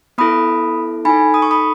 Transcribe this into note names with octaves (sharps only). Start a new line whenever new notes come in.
B3 E4 A4 B5 D#6
D#4 A4 G#5 B5
D#6
C#6
B5 D#6